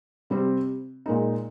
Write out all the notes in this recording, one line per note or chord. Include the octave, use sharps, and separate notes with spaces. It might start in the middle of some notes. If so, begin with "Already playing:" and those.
C3 G3 C4
A#2 G#3 D#4